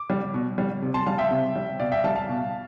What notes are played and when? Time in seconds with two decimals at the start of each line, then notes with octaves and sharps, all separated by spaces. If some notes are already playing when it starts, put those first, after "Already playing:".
Already playing: D6
0.10 G3
0.34 B2
0.58 G3
0.82 C3
0.94 A5 C6
1.06 G3 F5 A5
1.18 E5 G5
1.31 C3
1.56 G3
1.80 B2 D5 F5
1.92 E5 G5
2.04 G3 F5 A5
2.15 F5 A5
2.29 B2